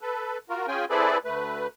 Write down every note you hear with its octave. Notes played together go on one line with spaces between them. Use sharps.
A4 B4
F4 F#4 A#4
C#4 F4 G#4 G5 G#5
C4 E4 G#4 A4 B4 D5
D2 A3 B4